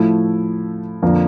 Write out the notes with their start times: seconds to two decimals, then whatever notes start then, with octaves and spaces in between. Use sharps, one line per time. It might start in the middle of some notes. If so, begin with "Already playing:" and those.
Already playing: A2 F3 A3 E4
1.02 F2 D3 F3 A#3 D4